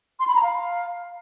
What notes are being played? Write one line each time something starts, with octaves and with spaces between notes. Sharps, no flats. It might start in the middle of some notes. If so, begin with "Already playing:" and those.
C6
B5
A#5
F5